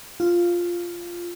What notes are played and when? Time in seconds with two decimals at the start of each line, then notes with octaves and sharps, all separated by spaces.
0.20 F4